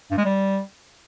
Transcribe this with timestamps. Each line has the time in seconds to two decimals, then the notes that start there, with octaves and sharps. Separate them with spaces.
0.11 G2
0.18 G#3
0.25 G3